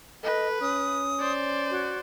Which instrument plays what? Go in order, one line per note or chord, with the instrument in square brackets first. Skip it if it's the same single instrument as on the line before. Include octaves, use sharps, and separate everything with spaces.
[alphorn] A4 [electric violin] B4 [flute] D#5
[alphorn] C#4 [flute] D#6
[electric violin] C5 D5
[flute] F#4